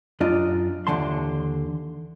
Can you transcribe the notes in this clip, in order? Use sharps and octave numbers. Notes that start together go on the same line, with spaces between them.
F#2 D4 F4 D#5
D#2 D3 E3 A5 C6